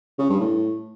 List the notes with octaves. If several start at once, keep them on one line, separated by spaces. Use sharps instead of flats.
C#3
G2
A2